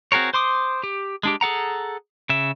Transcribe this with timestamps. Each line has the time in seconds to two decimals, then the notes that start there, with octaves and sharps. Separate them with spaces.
0.12 C4 F#4 G#4 A#4 C#5
0.33 C5 C6 D6 D#6
0.84 G4
1.23 G#3 D4 G4
1.41 G#4 A4 F#5 A#5
2.29 C#3 E5